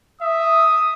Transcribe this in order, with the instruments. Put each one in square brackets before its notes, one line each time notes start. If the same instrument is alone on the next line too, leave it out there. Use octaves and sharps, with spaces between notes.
[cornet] E5 [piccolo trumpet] D#6